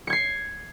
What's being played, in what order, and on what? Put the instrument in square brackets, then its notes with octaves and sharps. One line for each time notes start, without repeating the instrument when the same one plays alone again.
[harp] C#7
G#6
C7